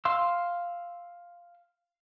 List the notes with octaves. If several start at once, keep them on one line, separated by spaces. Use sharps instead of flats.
F5 C6 E6